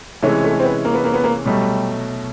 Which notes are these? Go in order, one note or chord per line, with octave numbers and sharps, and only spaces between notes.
C3 E3 G#3 A3 C#4
A3
C4
B3
A#3
B3
A#3
B3
A#3
B2 F#3 G3 A3